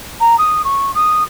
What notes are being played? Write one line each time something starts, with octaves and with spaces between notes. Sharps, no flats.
A#5
D#6
C#6
D#6